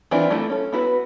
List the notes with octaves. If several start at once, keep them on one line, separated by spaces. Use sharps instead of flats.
E3 C4 D4 E4 F4
A3 A#3 E4
C#4 A4
B3 E4 F#4 B4